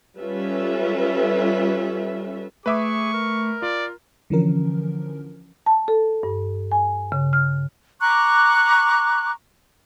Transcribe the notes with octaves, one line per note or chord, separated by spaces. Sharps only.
G3 C#4 F4 A4 B4 E5
A3 G#4 B4 E5 C#6 D6
A#4
F4 D5
D3 E3 F3 C#4 A#4
A5
A4
G2
G#5
C#3
F6
A#5 C#6 D6 F#6